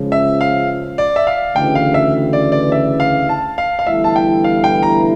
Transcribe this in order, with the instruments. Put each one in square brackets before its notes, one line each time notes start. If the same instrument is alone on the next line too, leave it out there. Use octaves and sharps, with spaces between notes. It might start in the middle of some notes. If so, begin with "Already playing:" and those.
Already playing: [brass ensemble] C#2 C#3 F3
[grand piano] E5
F5
D5
E5
F5
[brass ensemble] D2 C#3 E3 [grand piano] G5
[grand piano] F5
E5
D5
D5
E5
F5
A5
F5
F5
[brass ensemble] G1 G2 E3 A3 E4 [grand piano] E5
[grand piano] A5
G5
F5
G5
A#5